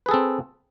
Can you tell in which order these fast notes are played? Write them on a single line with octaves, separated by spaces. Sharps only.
B4 G#4 A4 C4